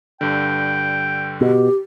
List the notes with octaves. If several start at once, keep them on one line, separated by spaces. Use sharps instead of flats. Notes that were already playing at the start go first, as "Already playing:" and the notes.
G2 D3 G5
B2 G4